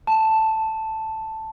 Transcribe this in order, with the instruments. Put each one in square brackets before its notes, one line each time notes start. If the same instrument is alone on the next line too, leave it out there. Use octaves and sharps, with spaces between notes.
[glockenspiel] A5